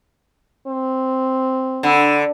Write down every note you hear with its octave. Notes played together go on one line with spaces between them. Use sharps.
C4
D3 F#5 B5 E6